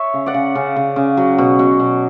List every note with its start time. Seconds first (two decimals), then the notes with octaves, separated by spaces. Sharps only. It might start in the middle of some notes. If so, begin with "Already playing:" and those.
Already playing: C#5 E5
0.14 C#3
0.26 D5 F#5
0.34 C#3
0.55 C#3
0.76 C#3
0.96 C#3
1.17 F#3
1.38 B2
1.59 B2
1.80 B2